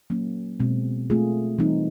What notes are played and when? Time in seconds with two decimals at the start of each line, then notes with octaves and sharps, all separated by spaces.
0.10 F#3 A#3 C#4
0.60 B2 G#3 C4
1.10 A3 C4 F4 G#4
1.58 E3 G3 C4 D#4